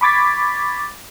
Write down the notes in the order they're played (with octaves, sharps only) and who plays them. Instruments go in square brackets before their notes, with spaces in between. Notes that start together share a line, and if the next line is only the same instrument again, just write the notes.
[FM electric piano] B5 C#6 D6 G#6 A6 B6